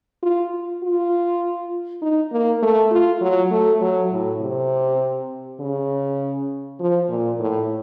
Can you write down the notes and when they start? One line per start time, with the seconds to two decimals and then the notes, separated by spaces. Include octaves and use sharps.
0.22 F4
0.83 F4
2.02 D#4
2.32 A#3
2.62 A3
2.91 F4
3.21 F#3
3.51 A3
3.81 F#3
4.11 A2
4.40 C3
5.60 C#3
6.80 F3
7.09 A#2
7.39 A2